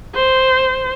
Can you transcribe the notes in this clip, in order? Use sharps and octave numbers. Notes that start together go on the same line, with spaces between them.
C5